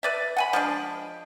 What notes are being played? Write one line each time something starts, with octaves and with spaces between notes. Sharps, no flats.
B4 D5 E5
F#5 G#5 B5
F3 G#3 D4